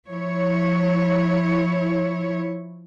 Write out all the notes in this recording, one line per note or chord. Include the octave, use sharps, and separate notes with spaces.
F3 E4 C#5